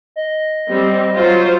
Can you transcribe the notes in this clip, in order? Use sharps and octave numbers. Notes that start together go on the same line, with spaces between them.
D#5
G3 C4
F#3 F4 C5